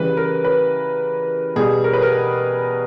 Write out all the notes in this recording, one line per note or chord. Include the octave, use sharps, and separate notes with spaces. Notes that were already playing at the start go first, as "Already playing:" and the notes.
Already playing: C#3 E3 G3 B4
A#4
B4
B2 G3 G#4
A#4
B4
A#4